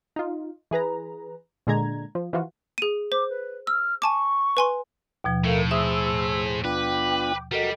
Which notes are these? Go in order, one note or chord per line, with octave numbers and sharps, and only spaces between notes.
D#4 F4
E3 G#4 B4 A#5
A#2 D3 G#3 A#5 G#6
F3
E3 F3 F4 F#4
G#4 D#7
C5 D6
B4
E6 F6
G#5 A5 C#6 D6
B4 G#5 C6
D#2 B2 F3
A2 A4 A#4 E5 F5
G#4 C5 E5 D#6 E6
B3 D4 F4 B4 G5 D6
G3 F#4 A4 A#4 D#5